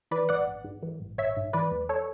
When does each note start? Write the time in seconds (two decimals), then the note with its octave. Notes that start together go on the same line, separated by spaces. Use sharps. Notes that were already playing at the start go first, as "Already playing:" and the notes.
0.11 E3 B4 D5
0.29 A1 D5 F#5
0.47 A1
0.64 G#2
0.83 E3
1.00 A1
1.18 A1 C#5 E5
1.37 G#2
1.53 E3 B4 D5
1.71 E2
1.89 A4 C#5